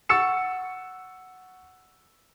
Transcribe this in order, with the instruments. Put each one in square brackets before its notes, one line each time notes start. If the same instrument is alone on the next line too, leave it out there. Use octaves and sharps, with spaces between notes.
[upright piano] F#5 C#6 E6 A6 C#7 E7